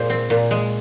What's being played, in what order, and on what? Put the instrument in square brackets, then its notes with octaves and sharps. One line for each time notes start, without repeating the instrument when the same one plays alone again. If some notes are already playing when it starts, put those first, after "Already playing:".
Already playing: [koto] A#2 G#3 C5
C4
A#2
G#3